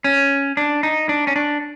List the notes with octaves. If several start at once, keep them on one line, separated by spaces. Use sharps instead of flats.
C#4
D4
D#4
D4
C#4
D4